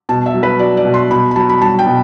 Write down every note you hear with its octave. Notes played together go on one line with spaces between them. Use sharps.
B2 A5
E5
F#3
B4
F#3 D5
D5
B2
C6
B2 B5
B5
F#3 A5
B5
F#3 A5
G5
B2